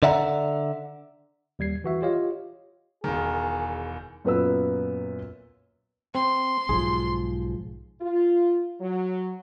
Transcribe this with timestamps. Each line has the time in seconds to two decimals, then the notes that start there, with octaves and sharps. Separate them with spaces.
0.03 D3 D5 E5 F#5 A#5
1.59 D#2 G3 G#6 C7
1.84 E3 F#4 E5
2.02 F4 G4 C#5 D#5 F5
3.04 E1 D#3 G#4
4.25 F#2 A#2 B3 B4 E6
6.15 C4 C6
6.69 B1 G#2 F3 G#4
8.01 F4
8.80 F#3